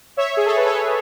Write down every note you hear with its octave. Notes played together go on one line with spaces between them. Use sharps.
C#5 E5
G#4
A4
B4
A4 C#5